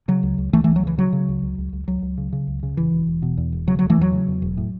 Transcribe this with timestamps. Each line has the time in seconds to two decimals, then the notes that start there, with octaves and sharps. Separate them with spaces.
0.08 C#3 F#3
0.23 C#2
0.38 C#2
0.53 C#2 E3 A3
0.64 C#2 E3 A3
0.76 F#3
0.83 C#3 E3
0.97 C#3 F#3
1.13 C#3
1.28 C#2
1.43 C#2
1.58 C#2
1.73 C#2
1.88 C#2 F#3
2.02 C#2
2.18 C#3
2.33 C#3
2.47 C#2
2.63 C#3
2.77 E1 E3
2.92 E1
3.07 E1
3.22 B2
3.38 E2
3.53 E1
3.67 C#3 F#3
3.79 E1 F#3
3.90 E3 A3
3.98 E2 F#3
4.12 C#3
4.28 E2
4.42 E1
4.57 A2